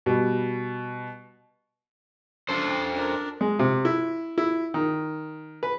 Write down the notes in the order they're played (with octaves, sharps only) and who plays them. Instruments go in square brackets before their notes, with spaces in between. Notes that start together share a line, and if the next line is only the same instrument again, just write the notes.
[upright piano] B2 G3
[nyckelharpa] D4 [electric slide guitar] A4 C5
[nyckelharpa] D4 A#4
[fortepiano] G#3
C3
E4
E4
D#3
B4